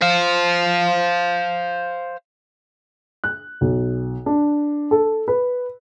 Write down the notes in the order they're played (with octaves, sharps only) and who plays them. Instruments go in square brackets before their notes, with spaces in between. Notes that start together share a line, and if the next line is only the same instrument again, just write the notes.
[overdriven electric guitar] C5 F5
[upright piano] F#6
B1
D4
A4
B4